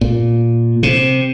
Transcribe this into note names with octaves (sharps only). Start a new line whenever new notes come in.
A#2
C3